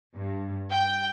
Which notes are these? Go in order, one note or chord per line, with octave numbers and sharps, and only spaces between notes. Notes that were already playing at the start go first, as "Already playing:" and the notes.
G2
G5